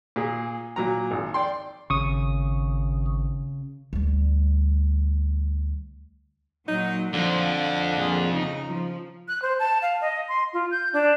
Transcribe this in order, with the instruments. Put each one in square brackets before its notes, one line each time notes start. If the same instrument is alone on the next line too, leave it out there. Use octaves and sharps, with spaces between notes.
[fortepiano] A#2 G#4
A#2 F#3 A#5
G#1
D5 G5 C6
[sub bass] G#1 [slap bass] C#3 [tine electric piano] C#6 D#6
[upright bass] D2 G3
[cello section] A#2 F#3 [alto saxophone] D#4
[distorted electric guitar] F2 [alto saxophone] D3 [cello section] F3
[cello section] A#2 F3 G#4
C#3 D#4
F3
[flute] F#6
C5
A5
F5
D#5
C6
F4
G6
D4